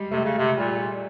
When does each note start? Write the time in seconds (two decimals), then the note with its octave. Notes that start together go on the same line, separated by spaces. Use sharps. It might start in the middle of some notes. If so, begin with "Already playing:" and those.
Already playing: G3 G#3
0.11 C3 A3
0.25 C#3
0.38 C3
0.57 A#2 G3